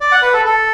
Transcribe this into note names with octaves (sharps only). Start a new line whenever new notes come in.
D5
F#5
B4
A4
A4